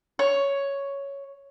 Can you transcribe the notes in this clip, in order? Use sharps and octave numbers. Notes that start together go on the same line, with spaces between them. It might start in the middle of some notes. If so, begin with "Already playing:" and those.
C#5